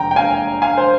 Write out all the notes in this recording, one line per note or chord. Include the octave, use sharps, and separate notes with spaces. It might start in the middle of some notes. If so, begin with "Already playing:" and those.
Already playing: F1 E2 G5 A#5
G5
F5 G#5
F5 G#5
C5